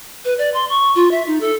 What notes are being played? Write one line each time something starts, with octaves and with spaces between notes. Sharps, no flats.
B4
D5
C6
C#6
F4
E5
D#4
A4